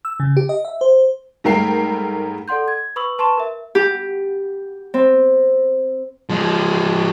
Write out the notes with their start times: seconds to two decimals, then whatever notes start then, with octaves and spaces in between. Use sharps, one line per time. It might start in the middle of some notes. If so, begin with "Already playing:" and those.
0.05 E6
0.20 C#3
0.37 G4
0.49 D#5
0.65 E5
0.81 C5
1.44 G#2 G3 A3 A#4 G5 C7
2.48 A4 D5 F#5 C6 G6
2.68 G#6
2.96 B4 B5 C#6 D#6 E6 F#7
3.19 B4 A5 C6 C#6 E7
3.37 A#4 E5
3.75 G4
4.94 C4
6.30 F3 G#3